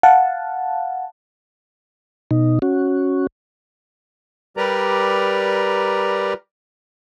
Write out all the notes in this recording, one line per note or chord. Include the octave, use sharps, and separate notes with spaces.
F5 F#5 A5
B2 D#4
C#4 F#4
G3 G4 A#4 B4 D5 A#5